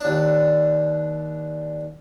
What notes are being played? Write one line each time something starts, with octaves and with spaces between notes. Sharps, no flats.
D#2 D4